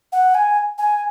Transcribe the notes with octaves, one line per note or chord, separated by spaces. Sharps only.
F#5
G#5
G#5